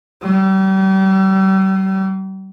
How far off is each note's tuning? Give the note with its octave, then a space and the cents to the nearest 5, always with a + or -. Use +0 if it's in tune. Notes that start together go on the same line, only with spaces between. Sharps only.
G3 -40